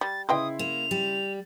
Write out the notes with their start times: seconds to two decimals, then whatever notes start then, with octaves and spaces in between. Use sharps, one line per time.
0.01 G3 A6
0.29 C#3 E4 B4 D#5 G5 C6 D#6
0.59 A#3 F7
0.91 G3